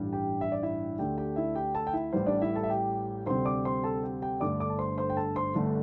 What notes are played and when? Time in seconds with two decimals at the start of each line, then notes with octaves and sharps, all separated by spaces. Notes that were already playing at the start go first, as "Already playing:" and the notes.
Already playing: A1 G2 G3
0.13 G4 G5
0.41 E5
0.52 D5
0.62 E4 E5
0.98 D2 D3 A3 D4 G4 G5
1.18 G4 G5
1.36 E4 E5
1.55 G4 G5
1.75 A4 A5
1.87 G5
1.93 E4 E5
2.13 A1 A2 E3 G3 C5
2.26 D4 D5
2.42 E4 E5
2.55 A4 A5
2.63 E5
2.70 G4 G5
3.26 D2 C3 G3 C4 C5 C6
3.45 D5 D6
3.65 C5 C6
3.84 A4 A5
4.03 G4 G5
4.22 G4 G5
4.40 G1 G2 D3 A3 D5 D6
4.60 D5 D6
4.70 A5
4.79 C5 C6
4.98 C5 C6
5.10 G5
5.17 A4 A5
5.36 C5 C6
5.54 G1 G2 D3 A3